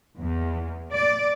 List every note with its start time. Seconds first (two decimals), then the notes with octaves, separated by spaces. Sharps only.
0.20 E2
0.93 D5